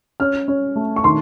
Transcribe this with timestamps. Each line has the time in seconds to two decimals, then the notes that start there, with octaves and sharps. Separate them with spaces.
0.20 C#4 F6
0.48 C#4
0.76 A3
0.96 C#6
1.04 D#3 C6